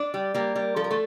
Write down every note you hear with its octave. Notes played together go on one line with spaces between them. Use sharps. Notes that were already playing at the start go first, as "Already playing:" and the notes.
Already playing: D4 D5
G3
G3 A#3 A#4
G3
F3 A4
A#4
A3 A4